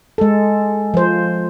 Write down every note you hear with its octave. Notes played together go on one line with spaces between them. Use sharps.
G#3 A4
F3 C5